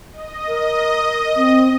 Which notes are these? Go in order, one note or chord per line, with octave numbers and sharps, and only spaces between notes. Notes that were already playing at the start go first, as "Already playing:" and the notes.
D#5
A#4
C4